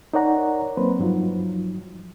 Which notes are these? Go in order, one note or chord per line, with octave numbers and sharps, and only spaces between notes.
D#4 A#4 C#5 D5 F#5 A#5
F#3 A#3 C4 B4 C5
G2 F3 F#3 D#4 F4